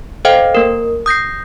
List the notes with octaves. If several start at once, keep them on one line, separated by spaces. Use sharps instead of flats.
A4 C5 D#5 F5 G5
A#3 A#4
D#6 G6 A#6 C7